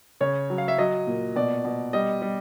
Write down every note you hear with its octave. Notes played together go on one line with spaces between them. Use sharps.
C#3 C#5
F#3
F5
E5
F#3 D#5
A#2
B2 D5
B2
G3 D#5
G3